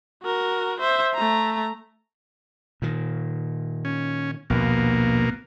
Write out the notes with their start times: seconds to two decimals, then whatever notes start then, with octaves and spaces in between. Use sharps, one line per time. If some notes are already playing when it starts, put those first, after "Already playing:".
0.23 F#4 A#4
0.80 C5 E5
1.14 A3 A#5
2.82 A#2 D#3
3.85 C#4
4.50 A#1 D#2 B2 A#3